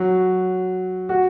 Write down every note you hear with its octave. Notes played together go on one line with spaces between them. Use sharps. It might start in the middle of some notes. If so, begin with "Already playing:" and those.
Already playing: F#3
F#4